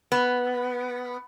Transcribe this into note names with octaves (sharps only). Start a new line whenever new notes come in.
B3